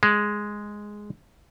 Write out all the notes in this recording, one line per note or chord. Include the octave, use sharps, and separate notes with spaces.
G#3